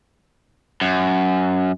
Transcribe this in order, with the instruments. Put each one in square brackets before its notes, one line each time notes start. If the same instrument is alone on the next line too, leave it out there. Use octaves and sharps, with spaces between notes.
[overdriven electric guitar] F#2